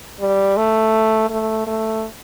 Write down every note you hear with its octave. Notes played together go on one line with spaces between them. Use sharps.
G3
A3
A3
A3